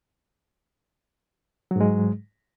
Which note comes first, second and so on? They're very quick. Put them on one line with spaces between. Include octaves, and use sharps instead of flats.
F#3 G#2 G#3